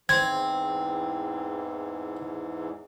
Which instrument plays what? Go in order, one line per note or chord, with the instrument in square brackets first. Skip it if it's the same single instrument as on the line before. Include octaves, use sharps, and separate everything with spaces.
[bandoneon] E2 G#2 E3 [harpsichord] C4 [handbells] G#6